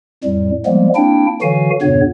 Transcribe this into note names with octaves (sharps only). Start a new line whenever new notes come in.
F2 A2 G3
F3 G3 G#3 A#3 B3
A#3 C4 D4 E4 G5
D3 E3 F#3 F#4 F5 G#5
E2 G2 A#2 C#3 B3 C#5